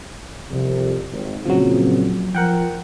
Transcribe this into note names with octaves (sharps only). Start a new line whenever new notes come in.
C2 F2 C3
G#1
A#2 C#3 F3 F#3 C4
F3 A#4 F#5 G5